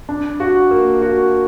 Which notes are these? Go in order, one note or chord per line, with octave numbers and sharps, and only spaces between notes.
D4
F#4
A#3
F#4